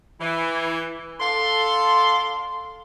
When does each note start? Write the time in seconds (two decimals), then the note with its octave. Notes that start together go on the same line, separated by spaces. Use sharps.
0.20 E3
1.20 D4 A4 F5 C6